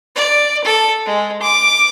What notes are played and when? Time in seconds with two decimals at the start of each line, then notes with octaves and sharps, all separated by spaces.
0.16 D5
0.64 A4
1.06 G#3
1.42 D6